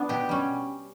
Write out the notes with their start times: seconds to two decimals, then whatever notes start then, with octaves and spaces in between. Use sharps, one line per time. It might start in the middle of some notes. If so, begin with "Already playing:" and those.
Already playing: B3 D4
0.09 B2 G4
0.29 G3 C#4